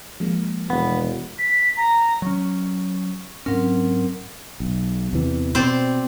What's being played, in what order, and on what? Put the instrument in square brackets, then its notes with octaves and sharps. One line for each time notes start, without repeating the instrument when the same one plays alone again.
[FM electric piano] F3 G#3 A#3
[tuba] E1 [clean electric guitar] B3
[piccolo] B6
A#5
[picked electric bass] F#3 C#4 [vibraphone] C#6
[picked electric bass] G#2 C#4 [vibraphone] F#3 C4 A#4
[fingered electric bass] B1
E2 C3 E3
[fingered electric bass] B2 [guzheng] C4 C5 D5